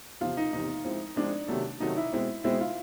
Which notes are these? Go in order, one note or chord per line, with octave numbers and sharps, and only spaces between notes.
E2 C3 F3 F4
D#4
E2 C3 F3 D#4
F3 G#3 C4 E4
F3 G#3 C4 D4 E4
C3 D#3 F#3 A3
C3 D#3 F#3 A3 D#4
E4
B2 G#3 C4 E4
B2 G#3 C4 E4
F4